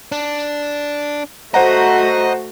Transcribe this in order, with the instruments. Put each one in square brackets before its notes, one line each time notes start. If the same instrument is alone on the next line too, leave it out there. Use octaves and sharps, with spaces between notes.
[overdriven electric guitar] D4
[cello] A3 F#4 [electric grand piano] C5 F#5 A#5 [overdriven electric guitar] D#5